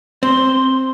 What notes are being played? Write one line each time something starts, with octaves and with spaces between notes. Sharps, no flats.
C4 C6